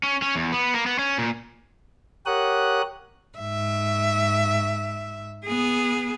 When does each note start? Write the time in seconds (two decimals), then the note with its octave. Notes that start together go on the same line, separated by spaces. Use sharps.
0.03 C#4
0.22 C#4
0.36 E2
0.52 B3
0.74 A#3
0.86 B3
0.99 C#4
1.18 A#2
2.26 G4 A#4 C#5 F#5 D#6 F#6
3.38 G#2 E5
5.46 B3 G#4